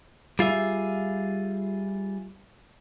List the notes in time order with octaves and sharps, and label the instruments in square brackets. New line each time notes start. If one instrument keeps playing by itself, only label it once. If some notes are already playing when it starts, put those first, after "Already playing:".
[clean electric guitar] G3 F4 G#4 E5